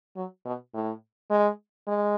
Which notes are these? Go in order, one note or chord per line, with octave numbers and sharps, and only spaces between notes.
F#3
B2
A2
G#3
G#3